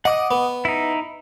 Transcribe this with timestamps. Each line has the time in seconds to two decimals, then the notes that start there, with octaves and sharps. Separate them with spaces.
0.05 D#5 F#5 D6 D#6
0.31 B3
0.65 D#4 E4